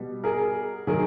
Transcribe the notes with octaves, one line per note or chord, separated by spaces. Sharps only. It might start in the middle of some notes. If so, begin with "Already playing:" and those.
Already playing: B2 G3
G#4 A#4
D#3 F#3 G#4 A#4